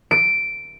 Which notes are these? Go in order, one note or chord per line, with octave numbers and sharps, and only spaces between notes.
D7